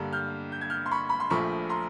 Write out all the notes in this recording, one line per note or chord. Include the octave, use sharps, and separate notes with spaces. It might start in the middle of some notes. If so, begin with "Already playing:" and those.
Already playing: G2 D3 G3 A#3
F6 G6
G6
G#6
F6 G6
C6
B5 C#6
B5
C6
A#1 A#2 F3 A3 B5 C#6
A#5 C6